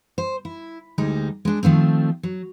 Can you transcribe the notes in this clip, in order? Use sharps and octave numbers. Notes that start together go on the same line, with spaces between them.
C5
E4
D2 G3 G#3 D#4
G#3 D4
D#3 F3 A3 C4
F#3